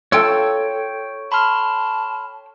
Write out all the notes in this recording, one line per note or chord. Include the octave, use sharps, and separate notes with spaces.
F4 A4 C#5 G5 E6
A5 B5 C6 F6